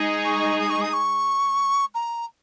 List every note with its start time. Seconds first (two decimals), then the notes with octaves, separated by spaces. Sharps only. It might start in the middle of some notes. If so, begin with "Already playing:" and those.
Already playing: G#3 D#4 G#4
0.25 C#6
0.60 D#6
0.70 C#6
0.81 D#6
0.93 C#6
1.95 A#5